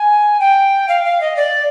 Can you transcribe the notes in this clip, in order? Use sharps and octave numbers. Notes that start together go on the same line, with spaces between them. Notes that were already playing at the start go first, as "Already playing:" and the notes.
Already playing: G#5
G5
F5
F5
D#5
D5